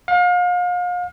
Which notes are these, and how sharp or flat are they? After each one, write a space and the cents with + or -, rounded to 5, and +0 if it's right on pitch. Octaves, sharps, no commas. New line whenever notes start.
F5 +35